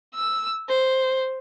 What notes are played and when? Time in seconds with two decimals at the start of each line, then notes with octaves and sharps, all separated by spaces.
0.15 E6
0.69 C5